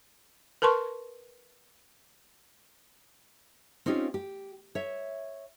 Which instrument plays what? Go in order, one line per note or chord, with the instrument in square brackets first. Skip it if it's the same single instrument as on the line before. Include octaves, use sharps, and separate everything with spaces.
[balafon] A#4 B4 A5 C6 C#6
[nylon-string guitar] C4 C#4 D#4 F4 G4
G4
C#5 E5